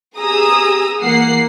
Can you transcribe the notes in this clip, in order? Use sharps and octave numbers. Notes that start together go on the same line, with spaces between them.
G4 G#4 A#5 D#6 E6
E3 A#3 F#5 C7